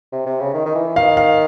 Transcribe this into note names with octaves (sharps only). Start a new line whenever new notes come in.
C3
C3
C#3
D#3
D#3
E3
D#3 F5
F5